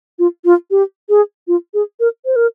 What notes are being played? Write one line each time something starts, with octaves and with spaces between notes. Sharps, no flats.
F4
F4
G4
G#4
F4
G#4
A#4
C5
A#4